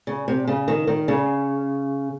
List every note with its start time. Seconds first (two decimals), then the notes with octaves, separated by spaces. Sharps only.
0.07 C#3
0.28 C3
0.47 C#3
0.68 D#3
0.87 D#3
1.08 C#3